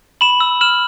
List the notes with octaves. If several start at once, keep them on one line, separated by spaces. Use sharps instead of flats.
B5 E7 F#7
E6
F6 E7 F#7